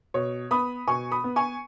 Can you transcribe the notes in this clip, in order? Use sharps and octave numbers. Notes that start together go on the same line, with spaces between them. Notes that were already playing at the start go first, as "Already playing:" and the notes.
B2 C#5
B3 B5 D#6
B2 G#5 C#6
B5 D#6
B3
G#5 C#6